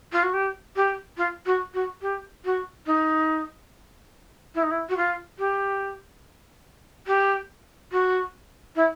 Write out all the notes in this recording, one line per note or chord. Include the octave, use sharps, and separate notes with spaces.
F4
F#4
G4
G4
F4
F#4
F#4
G4
F#4
D#4
E4
D#4
E4
F#4
F4
G4
G4
F#4
E4